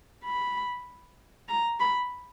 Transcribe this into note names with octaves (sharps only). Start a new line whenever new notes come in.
B5
A#5
B5